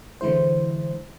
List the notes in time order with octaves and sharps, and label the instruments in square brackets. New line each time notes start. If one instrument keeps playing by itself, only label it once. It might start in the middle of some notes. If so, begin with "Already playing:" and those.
[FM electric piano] D3 E3 G#3 E4 C5